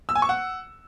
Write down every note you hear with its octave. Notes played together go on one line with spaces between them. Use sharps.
E6
G#5
C#6
F#5